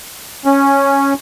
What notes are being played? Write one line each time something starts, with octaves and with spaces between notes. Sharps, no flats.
C#4